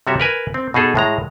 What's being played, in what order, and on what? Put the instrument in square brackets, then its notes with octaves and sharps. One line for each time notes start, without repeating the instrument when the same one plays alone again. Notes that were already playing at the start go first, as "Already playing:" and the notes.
[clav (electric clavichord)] C3 G3 F#4 C#5 E5
A#4 B4 G#5
C4
B2 D#4 G#4 A4
A2 G#3 A#5